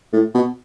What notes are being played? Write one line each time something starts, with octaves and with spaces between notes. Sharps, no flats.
A2
B2